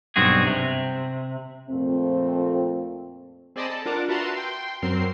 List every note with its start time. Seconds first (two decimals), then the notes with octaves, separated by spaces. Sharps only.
0.16 B1 G2 C4 F#4 G#4
0.47 C3
1.70 F2 A#2 A3 C4
3.56 C4 G#4 D5 D#5 A5 B5
3.70 A4 A5
3.86 D4 F4 A#4 F#5 A5 D6
4.08 F#4 B4 E5 A5 A#5 C6
4.35 G5 C6
4.82 F#2 F#3 C4 A#4 C6 C7